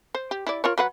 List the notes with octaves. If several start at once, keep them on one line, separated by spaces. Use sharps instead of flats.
C5
G4
E4 D5
F4 A#4 C#5
F#3 B4 F#5